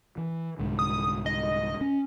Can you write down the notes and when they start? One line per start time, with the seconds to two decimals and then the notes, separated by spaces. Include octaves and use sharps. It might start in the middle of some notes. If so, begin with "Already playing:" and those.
0.18 E3
0.59 C2 G#2 D3
0.79 D#6
1.26 D#5
1.81 C#4